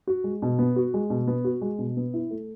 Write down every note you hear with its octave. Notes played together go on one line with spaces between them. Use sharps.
F#4
G#3
B2
B3
F#4
G#3
B2
B3
F#4
G#3
B2
B3
E4
A3